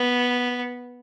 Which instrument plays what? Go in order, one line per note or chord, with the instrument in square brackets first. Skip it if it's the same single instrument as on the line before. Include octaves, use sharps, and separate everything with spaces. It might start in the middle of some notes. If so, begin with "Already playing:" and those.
Already playing: [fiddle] B3